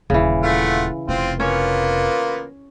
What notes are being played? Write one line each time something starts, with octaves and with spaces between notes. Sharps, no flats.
D#1 C#3 E3
A3 F4 F#5
F1 C3 C4 F4
A#3 B3 C#4 F4 C#5